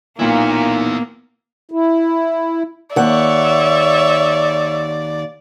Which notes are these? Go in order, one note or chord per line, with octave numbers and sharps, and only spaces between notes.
B1 A#2 A#3 B3 D#4 E4 F5
E4
D#2 C#5 D5 E5 F#5